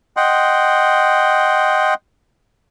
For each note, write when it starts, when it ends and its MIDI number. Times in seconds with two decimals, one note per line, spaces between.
0.17 1.94 75
0.17 1.94 78
0.17 1.94 79
0.17 1.94 84